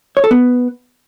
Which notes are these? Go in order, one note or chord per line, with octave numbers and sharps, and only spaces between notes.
C#5
A4
B3